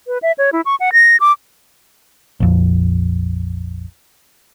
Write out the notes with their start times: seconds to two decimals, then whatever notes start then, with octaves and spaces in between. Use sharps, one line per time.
0.07 B4
0.22 E5
0.38 C#5
0.53 E4
0.66 C#6
0.80 F#5
0.93 A#6
1.20 D6
2.40 A#1 F2